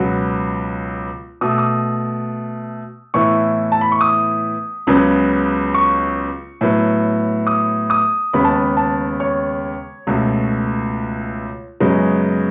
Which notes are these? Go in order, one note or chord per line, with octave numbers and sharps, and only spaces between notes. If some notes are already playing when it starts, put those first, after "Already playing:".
Already playing: C#2 B2 F#3 B3 F#5
B2 A3 D#6
E6
D#6
A2 E3 B3 C#6
A5
B5
C#6
D#6
C#2 C#3 F#3 B3
C#6
A2 F#3 B3
D#6
D#6
D#2 C#3 G#3 B3 B5
A5
B5
A5
C#5
C#2 B2 A3
F#2 C#3 G#3 B3